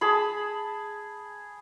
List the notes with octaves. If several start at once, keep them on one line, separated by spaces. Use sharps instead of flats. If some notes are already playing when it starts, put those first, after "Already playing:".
G#4 A5 B5